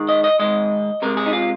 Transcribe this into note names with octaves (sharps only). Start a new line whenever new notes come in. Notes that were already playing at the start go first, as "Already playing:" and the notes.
Already playing: G#2 D#3 G#3
D#5
D#5
G#2 D#3 G#3 D#5
C3 G#3 A#4
G#4
D#4
F4